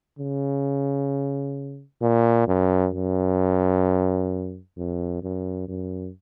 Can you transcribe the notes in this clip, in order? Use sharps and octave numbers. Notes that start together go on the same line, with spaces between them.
C#3
A#2
F#2
F#2
F2
F#2
F#2